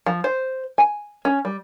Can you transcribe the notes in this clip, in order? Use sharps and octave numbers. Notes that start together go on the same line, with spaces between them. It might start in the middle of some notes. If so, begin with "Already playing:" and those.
F3
C5
G#5
C#4
G3